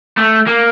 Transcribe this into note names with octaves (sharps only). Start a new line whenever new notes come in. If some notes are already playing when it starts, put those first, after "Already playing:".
A3
A#3